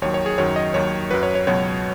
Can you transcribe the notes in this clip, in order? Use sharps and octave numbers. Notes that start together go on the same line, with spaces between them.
D#2 D#3 F#3 C#5
C#5
G#4
F#2 D#3 F#3 C#5
D#5
D#2 D#3 F#3 C#5
F#2 F#3 B4
C#5
C#5
C#2 B2 F#3 C#5